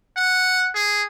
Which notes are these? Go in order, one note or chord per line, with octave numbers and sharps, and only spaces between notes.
F#5
G#4